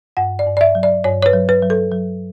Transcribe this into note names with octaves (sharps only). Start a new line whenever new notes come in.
G2 F#5
D5
G2
D5
E5
F#3
D5
G2 C#5
C#5
B4
F#3
B4
F#3
A4
F#3